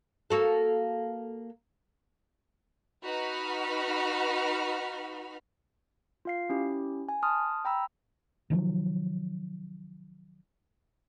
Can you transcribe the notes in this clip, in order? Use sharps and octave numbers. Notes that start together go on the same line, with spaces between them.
A#3 F#4 A4
D#4 F#4 B4 B5 F6
F4 F5 C7
C#4 E4 G4
G#5
A5 C6 D#6 F6
G5 A#5 B5 E6
C3 D#3 F3 F#3